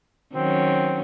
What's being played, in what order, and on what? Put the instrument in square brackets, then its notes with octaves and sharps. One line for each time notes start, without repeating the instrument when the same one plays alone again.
[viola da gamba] D#3 F#3 C#4 [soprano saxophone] C4